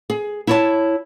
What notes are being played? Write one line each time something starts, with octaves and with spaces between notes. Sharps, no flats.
G#4
E4 C#5 A5